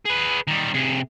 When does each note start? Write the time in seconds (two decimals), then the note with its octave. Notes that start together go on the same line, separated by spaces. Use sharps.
0.06 G#4 B4
0.48 D#3 G3
0.74 C3 G#4